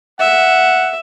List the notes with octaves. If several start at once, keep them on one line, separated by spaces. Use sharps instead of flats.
E5 F#5